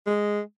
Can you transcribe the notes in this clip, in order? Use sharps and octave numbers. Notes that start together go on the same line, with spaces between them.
G#3